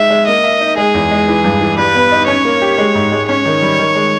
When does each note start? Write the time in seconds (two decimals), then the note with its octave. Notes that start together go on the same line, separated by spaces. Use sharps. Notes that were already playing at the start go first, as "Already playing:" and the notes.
Already playing: G#3 D#4 E5
0.10 G#3
0.27 A#3 D#5
0.44 E5
0.61 D#4
0.78 G#3 G#4
0.94 E2
1.11 G#3
1.28 E3
1.44 G2
1.61 E3
1.78 G3 B4
1.95 B3
2.12 D#4
2.28 C#4 C#5
2.45 A#3
2.62 G4
2.78 G#3
2.95 G#2
3.12 G#3
3.29 C#4 C#5
3.46 D#3
3.62 G3
3.79 D#3
3.96 G#3